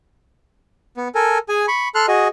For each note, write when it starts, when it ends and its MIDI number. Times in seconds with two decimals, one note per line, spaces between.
0.97 1.08 59
1.15 1.38 69
1.15 1.38 70
1.15 1.38 80
1.49 1.66 68
1.49 1.66 80
1.68 1.88 83
1.68 1.88 85
1.95 2.06 69
1.95 2.06 84
1.95 2.06 89
1.95 2.06 90
2.08 2.28 66
2.08 2.28 68
2.08 2.28 75